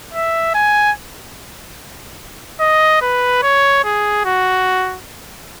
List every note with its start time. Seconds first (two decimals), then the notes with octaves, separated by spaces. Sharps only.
0.14 E5
0.54 G#5
2.61 D#5
3.02 B4
3.43 C#5
3.84 G#4
4.25 F#4